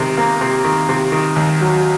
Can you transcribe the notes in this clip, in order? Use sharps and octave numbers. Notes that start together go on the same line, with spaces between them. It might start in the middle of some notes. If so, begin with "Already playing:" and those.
Already playing: C3 D#3
A#3
C3
D#3
C3
D#3
D#2
F#3